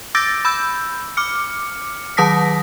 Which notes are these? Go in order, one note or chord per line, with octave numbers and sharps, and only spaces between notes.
D6 E6 G6 A6 A#6 D7
B5 E6 G6
D6 F6 C#7
D#3 F#3 A5 D#6 A#6 B6